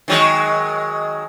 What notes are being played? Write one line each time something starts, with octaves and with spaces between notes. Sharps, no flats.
D#3 F#3 G#3